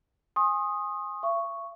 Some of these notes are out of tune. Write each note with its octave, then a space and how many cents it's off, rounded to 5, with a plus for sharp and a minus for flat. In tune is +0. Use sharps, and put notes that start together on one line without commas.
G#5 -15 C6 +40 D#6 +0
E5 +45 C#6 +0